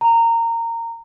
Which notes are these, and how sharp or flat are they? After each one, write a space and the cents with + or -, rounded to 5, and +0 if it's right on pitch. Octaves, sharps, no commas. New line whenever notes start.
A#5 -20